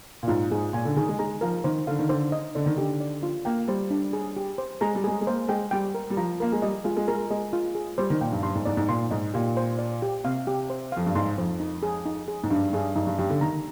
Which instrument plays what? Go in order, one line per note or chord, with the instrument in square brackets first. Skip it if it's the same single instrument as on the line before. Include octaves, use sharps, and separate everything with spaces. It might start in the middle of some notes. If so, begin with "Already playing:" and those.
[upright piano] A#2
[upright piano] G#2 [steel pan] F4
[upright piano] G#2 [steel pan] G#4
[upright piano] A#2 [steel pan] G#5
[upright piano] D3
[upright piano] D#3 [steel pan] G#4
[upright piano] G#3
[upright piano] G#3 [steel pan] A#5
[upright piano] F3 [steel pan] A#4
[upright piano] D#3 [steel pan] C5
[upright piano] D3 [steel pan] F5
[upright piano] D#3
[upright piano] D3 [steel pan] C5
[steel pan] D#5
[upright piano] D3 [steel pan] D5
[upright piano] D#3
[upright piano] D3 [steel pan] G4
[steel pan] D5
F4
[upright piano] A#3 [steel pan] G5
[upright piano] G3 [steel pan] C5
[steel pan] D4
G#4
G4
C5
[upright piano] G#3 [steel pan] A#5
[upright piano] G3
[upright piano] G#3 [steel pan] G#4
[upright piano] G#3
[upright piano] A#3 [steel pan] C5
[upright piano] G#3 [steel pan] G5
[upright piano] G3 [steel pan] G5
[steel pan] A#4
[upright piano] G3
[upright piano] F3 [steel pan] A#5
[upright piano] A#3 [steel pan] A#4
[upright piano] G#3
[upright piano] G3 [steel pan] D#5
[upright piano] G#3 [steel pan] F4
[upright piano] G#3
[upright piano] G#3 [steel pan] A#4
[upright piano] G#3 [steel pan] D#5
[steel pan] F4
G#4
[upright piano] G3 [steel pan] C5
[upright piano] D#3
[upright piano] A#2 [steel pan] G5
[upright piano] G2
[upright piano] G2 [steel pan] C6
[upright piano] G#2
[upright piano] G#2 [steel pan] D5
[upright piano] G#2
[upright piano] A#2 [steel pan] C6
[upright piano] G#2 [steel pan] D#5
[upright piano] A#2 [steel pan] G4
[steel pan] C5
D5
G4
[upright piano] C3 [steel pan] F5
[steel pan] G4
C5
[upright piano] F2 [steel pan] F5
[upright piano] G2
[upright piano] G#2 [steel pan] C6
[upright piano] F2 [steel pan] C5
[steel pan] D#4
G#4
D#4
G#4
[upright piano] G#2
[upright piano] G2 [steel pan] D4
[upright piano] G2 [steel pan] G#4
[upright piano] G2 [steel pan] D#4
[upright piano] G2
[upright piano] G2 [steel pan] G4
[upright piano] D3
[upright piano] D#3 [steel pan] A#5